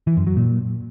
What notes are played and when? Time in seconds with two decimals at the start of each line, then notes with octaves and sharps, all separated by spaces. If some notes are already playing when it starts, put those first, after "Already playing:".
0.07 E3
0.17 F#2
0.27 F#3
0.36 A#2